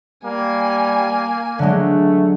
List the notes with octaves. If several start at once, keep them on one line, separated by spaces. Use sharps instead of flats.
G3 A#3 G#5
D3 F#3 G#3 A3